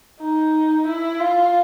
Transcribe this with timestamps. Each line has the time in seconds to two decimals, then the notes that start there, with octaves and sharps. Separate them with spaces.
0.20 D#4
0.87 E4
1.20 F4